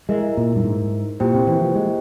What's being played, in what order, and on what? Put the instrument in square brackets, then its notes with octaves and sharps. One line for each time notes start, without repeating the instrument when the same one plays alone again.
[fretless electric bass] G#3 [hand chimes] E4 A#4 E5
[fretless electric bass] A#2
G2
G#2
[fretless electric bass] A#2 [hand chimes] A#3 E4 G4 C5 G5
[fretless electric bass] C3
E3
F3
G#3